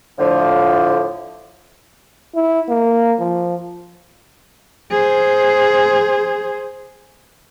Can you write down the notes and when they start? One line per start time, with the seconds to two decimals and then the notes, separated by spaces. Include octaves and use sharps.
0.19 A2 D3 F3
2.35 E4
2.69 A#3
3.19 F3
4.90 G#4 C5